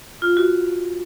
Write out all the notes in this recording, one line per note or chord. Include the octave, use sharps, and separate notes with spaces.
F4
F#4